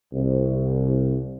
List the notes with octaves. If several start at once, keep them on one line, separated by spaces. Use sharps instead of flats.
C2